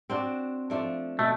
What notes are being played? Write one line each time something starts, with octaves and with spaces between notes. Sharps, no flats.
C4 D4 F#4
F3 A3 D4
B2 A3